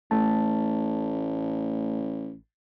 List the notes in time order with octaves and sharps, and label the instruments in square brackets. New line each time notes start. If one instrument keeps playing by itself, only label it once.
[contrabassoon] A1 [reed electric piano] A3 A5